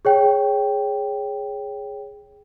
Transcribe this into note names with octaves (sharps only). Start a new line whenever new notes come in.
G#4 C#5 G5